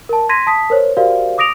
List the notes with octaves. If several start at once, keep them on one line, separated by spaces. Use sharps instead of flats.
A#4 A5
C6 G#6 A#6 B6 D#7
A5 D#6 B6
A#4 C5 C#5
F#4 G4 A#4 C5 D5 F5
D6 D#6 A#6 D7 F7